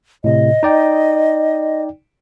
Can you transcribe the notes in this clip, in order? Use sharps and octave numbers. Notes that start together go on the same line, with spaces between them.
A2 C3 D#5
D#4 D5 G5